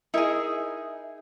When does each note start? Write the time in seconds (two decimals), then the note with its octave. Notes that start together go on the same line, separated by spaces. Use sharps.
0.14 D#4 E4 G#4 A#4 E5